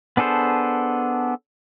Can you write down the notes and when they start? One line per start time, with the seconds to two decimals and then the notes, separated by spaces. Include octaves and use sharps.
0.17 B3 D4 G#4 A4 C5